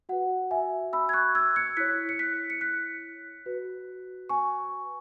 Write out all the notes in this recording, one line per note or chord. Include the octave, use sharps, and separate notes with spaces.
F#4 B4 F#5
E5 G#5
B5 E6
G#6
C#6 F#6
E6 G#6
G#6 C#7
E4 C#5 F#6 B6
C#7
F#6 B6
C#7
F#6 B6
F#4 B4
G#5 C#6